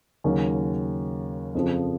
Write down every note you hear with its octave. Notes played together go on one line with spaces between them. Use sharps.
D#2 C#3 F#3 C#4
F2 C#3 F3